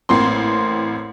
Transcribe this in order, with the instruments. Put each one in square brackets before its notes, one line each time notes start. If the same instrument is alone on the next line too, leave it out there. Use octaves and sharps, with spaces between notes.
[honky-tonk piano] A1 A#3 C4 C6